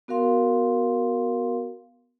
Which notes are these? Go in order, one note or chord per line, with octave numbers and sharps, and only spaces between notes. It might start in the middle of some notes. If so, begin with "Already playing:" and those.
B3 F#4 A#4 F5 C6